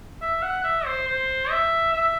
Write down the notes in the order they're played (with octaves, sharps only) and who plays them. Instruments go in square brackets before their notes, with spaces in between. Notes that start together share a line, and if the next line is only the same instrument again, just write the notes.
[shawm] E5
F#5
E5
C5
C5
E5
E5